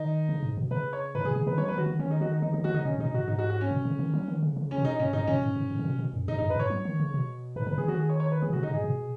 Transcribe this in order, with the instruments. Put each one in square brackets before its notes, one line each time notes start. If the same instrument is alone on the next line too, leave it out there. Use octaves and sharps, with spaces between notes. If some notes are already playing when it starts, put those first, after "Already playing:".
Already playing: [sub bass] D#3 [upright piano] D#4
[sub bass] C#3
G#2
B2
[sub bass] C#3 [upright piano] B4
[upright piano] C#5
[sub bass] G#2 [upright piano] B4
[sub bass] B2 [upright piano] G#4
[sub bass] C#3 [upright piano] G#4
[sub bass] D#3 [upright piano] B4
[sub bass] F#3 [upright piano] C#5
[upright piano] B4
[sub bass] D#3
[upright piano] F#4
[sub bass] D#3
[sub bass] D#3 [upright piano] C#4
[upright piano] D#4
[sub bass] D#3 [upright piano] F#4
[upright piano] D#4
[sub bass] D#3 [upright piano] D#4
[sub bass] D#3 [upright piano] D#4
[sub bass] D#3 [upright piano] F#4
[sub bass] C#3 [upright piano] D#4
[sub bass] B2 [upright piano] C#4
[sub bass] G#2
[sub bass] B2 [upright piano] D#4
[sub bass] G#2 [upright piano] F#4
[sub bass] G#2 [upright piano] D#4
[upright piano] F#4
F#4
C#4
[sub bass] B2
C#3
D#3
F#3
D#3
C#3
C#3
[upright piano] C#4
[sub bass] B2
[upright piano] D#4
[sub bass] G#2 [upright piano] C#4
[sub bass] G#2 [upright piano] D#4
[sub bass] B2 [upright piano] C#4
[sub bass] G#2
G#2
G#2
C#3
B2
B2
F#2
[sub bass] G#2 [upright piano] D#4
[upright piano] D#4
[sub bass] F#2
[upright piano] B4
[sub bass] G#2 [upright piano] C#5
[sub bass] F#3
D#3
C#3
B2
[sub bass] G#2 [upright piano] B4
[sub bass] C#3 [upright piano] B4
[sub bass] D#3 [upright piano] G#4
[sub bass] D#3 [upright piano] F#4
[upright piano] G#4
C#5
C#5
B4
[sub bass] D#3 [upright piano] G#4
[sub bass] B2
[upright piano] F#4
[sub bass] C#3
[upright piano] D#4
[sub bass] G#2 [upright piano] G#4
[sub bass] B2